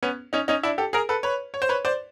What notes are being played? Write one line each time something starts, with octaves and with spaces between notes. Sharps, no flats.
B3 C#4
C#4 D#4
C#4 D#4
D4 E4
G4 A4
G#4 A#4
A4 B4
B4 C#5
C#5
C5
B4 C#5
C5 D5